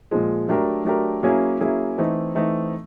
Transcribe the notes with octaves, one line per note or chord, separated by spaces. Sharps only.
A#2 F3 G#3
F#3 A3 D4 G4 A#4
F#3 A3 D4 G4 A#4
F#3 A#3 C#4 E4 G#4
F#3 A#3 C#4 E4 G#4
E3 A3 C4 D#4
E3 A3 C4 D#4